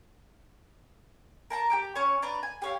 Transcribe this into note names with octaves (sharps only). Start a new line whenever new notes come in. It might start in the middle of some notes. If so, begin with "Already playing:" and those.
A#4 A5 A#5
G4 G5 D6
C#4 C#5
D4 B4 A#5
G#5
G4 C#5 F5